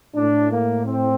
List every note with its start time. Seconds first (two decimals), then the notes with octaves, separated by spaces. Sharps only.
0.16 A2 D4
0.51 A#3
0.86 C4